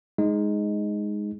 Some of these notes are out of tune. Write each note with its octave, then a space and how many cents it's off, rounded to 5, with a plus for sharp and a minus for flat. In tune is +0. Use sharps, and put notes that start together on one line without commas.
G#3 +0 D#4 +0